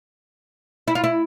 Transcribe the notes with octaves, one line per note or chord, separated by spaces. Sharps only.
E4
F4
E4